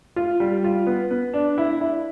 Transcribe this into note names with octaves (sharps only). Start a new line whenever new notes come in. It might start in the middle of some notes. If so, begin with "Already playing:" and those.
F4
G3
F4
B3
B3
D4
E4
E4